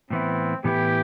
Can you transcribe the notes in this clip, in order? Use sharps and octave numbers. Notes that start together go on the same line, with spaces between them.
A2 E3 B3 C4 E4
A2 E3 B3 E4 G4 B4